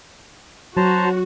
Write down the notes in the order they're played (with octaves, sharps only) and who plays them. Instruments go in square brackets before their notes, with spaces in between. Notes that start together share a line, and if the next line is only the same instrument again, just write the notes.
[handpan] F#3 [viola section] F#4 [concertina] C5 A5 A#5